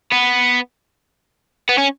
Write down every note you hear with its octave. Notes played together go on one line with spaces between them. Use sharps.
B3
B3
C#4